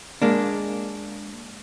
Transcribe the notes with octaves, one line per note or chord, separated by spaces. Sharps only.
G#3 A#3 D4